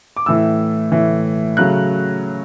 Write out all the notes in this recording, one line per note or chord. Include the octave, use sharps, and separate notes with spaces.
D6
A2 E3 A3 E6
A2 E3 A3
C#3 F#3 A3 F#6